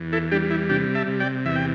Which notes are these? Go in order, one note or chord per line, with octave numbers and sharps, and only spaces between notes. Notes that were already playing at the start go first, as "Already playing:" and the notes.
Already playing: E2
E4 A4
G3 D4 G4
E4
C3 D4 G4
E5 A5
C3
D5 G5
E2 E5
G5